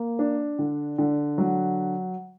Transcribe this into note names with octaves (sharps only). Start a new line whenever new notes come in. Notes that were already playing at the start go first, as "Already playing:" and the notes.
Already playing: A#3
D4
D3
D3
F#3